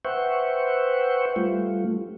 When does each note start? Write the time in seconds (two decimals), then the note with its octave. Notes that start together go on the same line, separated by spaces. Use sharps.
0.05 B4 C5 E5 F#5 G5 C#6
1.36 G3 A3 F4